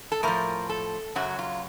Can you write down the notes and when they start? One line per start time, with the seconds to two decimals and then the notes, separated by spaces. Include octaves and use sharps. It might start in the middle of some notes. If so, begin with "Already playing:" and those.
0.12 A4
0.23 A2 F3 A#4
0.69 A4
1.15 F#2 C#3 F#3 F#4
1.39 F4